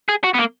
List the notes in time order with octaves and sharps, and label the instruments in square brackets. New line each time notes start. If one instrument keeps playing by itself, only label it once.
[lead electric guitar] G#4
F#4
B3
A#3